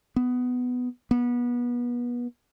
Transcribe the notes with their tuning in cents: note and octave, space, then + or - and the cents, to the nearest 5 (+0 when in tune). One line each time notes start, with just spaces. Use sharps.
B3 +10
B3 -30